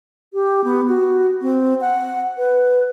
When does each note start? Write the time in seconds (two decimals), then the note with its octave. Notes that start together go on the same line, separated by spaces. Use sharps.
0.33 G4
0.64 B3
0.88 F#4
1.42 C4
1.81 F#5
2.37 B4